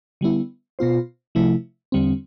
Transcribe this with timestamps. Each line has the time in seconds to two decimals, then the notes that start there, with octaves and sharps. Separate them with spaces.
0.21 D3 G3 B3 E4
0.79 B2 B3 F4 C5
1.35 C3 F3 A3 E4
1.92 E2 D3 G3 C4